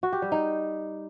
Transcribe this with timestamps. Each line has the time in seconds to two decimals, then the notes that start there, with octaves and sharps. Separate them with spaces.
0.03 F#4
0.13 G4
0.22 G3
0.32 D#4